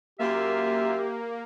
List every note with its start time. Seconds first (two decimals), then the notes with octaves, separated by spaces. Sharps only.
0.19 F#2 A#3 F4 G4 E5